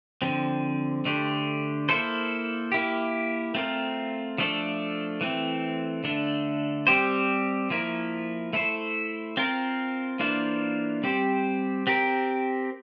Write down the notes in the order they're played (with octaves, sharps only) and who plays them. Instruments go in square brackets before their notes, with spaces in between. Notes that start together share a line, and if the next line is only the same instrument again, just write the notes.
[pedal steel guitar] D3 F3 C4
D3 A3 D4 G4 C5
A#3 E4 A4 C5
A#3 E4 G4
A3 C4 F4 A#4
F3 A3 D4 A4
E3 A3 C4
D3 A3 D4 A4
G3 C4 G4 C5
F3 A#3 E4 A#4
A3 E4 A4 C5
C4 F4 A#4
E3 A#3 D4 F4 C5
G3 C4 G4 C5
C4 G4 A#4